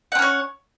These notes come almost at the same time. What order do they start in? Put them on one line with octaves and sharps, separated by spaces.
F#5 C4 C#4 C#5